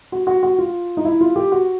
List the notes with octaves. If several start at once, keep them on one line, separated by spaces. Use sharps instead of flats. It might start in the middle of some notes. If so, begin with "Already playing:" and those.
F#4
F#4
F#4
F4
D#4
E4
F4
G4
F#4